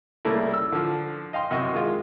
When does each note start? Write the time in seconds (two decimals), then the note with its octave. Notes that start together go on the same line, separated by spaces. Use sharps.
0.25 C2 C#3 G3 A3 A#3 E4
0.54 E6
0.72 D3 F3
1.33 D#5 F5 G5 C6
1.50 F#2 C3 F#4 D#5 C#6
1.73 D#3 G#3 F4